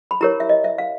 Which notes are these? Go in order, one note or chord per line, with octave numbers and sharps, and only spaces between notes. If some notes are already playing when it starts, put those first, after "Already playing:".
B5
E4 G4 A#4 C#5 A#5
E5
D#5
E5
F5